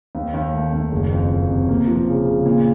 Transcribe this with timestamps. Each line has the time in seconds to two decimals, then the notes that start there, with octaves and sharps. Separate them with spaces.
0.15 D#2
0.34 D#2
0.53 A3
0.73 D#2
0.92 F#1
1.11 F2
1.30 F2
1.50 C3
1.69 A#3
1.88 F3
2.07 C#3
2.26 C#3
2.46 A#2